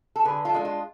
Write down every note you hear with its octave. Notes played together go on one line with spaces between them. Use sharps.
A4
D3 G#4 B4
F4 A4
G#3 D4
F4